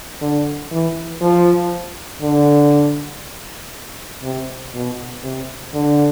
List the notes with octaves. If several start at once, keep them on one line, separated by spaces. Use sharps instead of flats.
D3
E3
F3
D3
C3
B2
C3
D3